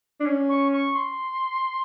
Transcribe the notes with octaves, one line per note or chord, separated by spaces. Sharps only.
D4
C#4
C#6
C#6
C6